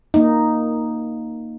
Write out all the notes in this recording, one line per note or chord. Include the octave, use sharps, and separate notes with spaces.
A#3 D#4